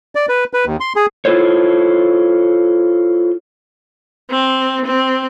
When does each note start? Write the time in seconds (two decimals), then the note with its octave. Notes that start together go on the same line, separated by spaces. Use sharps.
0.15 D5
0.29 B4
0.53 B4
0.65 D#2
0.80 C6
0.96 G#4
1.25 E4 F4 A4 C5 C#5
4.31 C4
4.85 C4